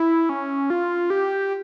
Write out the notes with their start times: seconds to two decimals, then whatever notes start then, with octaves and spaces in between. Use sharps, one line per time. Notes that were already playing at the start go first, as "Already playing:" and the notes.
Already playing: E4
0.29 C#4
0.70 F4
1.10 G4